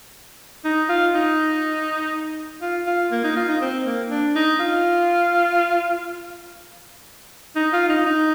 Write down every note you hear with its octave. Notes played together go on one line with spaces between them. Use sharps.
D#4
F4
D#4
F4
F4
A#3
D#4
F4
D#4
C4
A#3
D4
D#4
F4
D#4
F4
D#4
D#4